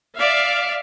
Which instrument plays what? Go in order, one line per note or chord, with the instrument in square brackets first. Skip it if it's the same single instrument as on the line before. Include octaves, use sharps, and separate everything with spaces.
[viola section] D5 E5 F5